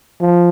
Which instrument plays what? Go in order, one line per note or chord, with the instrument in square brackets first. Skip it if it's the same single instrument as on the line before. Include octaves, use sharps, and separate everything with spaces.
[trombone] F3